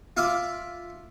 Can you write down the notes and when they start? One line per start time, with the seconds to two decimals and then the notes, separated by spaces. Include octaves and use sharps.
0.17 F4 E5 F5 B5 D6